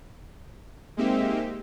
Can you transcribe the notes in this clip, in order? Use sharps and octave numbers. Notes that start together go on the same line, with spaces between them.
G#3 A#3 C4 D#4 G4 E5